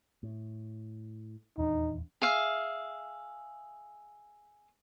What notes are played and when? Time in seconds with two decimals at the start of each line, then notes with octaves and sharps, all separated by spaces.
0.23 A2
1.58 D#1 E2 D4 D#4
2.22 G#4 E5 F5